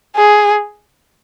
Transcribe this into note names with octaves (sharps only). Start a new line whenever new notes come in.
G#4